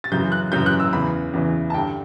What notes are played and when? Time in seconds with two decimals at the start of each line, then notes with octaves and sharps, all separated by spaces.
0.04 A6
0.12 F#2 C#3 E3 G6
0.32 F#6
0.52 F#2 C#3 E3 G6
0.66 F#6
0.80 E6
0.93 E2 C#3 E3 B5
1.34 E2 C#3 E3
1.70 A5
1.74 G2 G5
1.77 D3